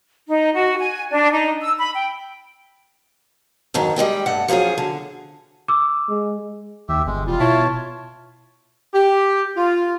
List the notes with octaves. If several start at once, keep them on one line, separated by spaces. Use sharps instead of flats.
D#4
F#4
G#5
D4
D#4
E6
B5
G5
F2 G#2 D#3 F#3
G3 G#3 D#5 G5
G2 A3 F#5
F3 F#3 C#4 F4 G#4
D3
D6 E6
G#3
D#2 G4 E5
G1 G#3 G#5
E1 G3 F4
B2 E4 C#5 A5
G4
F4